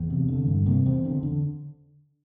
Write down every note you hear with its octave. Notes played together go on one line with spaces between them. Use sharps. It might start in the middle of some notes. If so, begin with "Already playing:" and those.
Already playing: E2
C3
D3
G2
C3 A#3
E2 C4
D3
D3